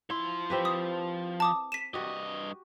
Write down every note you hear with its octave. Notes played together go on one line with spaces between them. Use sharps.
F3 E4 C6
C4 G4 B4
D#6
A5 D6 D#6
B6 D#7 E7
G2 F#4 G4 D#5